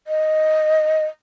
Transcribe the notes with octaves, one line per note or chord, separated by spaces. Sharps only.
D#5